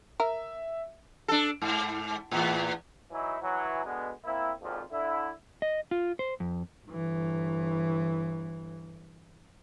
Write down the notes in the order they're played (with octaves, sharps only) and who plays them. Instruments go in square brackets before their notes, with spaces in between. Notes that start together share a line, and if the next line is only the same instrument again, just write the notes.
[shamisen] A#4 [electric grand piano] E5
[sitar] D4 A4
G#2
E2 A2
[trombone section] E3 F#3 D#4 E4
E3 F#3
B2 D3 G#3 B3
A#3 C4 E4
G#1 F2 A#2 F3 F4
D3 E4
[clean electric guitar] D#5
F4
C5
F2
[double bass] G1 E3